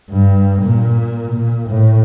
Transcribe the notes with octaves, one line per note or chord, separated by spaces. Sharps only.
G2
A#2
A#2
A2